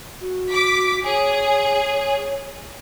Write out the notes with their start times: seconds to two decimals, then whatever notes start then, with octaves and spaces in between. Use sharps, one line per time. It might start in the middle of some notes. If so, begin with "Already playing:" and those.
0.21 F#4
0.49 D6 B6
1.05 G#4 C#5